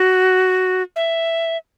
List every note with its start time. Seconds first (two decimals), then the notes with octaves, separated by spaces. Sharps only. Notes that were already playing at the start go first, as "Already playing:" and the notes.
Already playing: F#4
0.96 E5